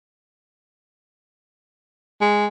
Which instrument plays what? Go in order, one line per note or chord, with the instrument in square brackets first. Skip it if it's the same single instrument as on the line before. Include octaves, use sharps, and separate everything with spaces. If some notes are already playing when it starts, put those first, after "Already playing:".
[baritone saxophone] G#3